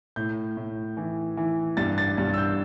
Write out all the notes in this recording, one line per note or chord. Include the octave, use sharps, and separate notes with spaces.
A2 G6
A2
E3
E3
G2 A6
A6
G2 A6
E6
G6